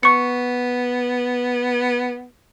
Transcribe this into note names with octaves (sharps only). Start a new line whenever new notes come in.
B3 C#6 C#7